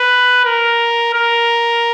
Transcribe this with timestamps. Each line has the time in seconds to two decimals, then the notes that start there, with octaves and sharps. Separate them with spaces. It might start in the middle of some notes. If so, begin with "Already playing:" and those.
Already playing: B4
0.45 A#4
1.13 A#4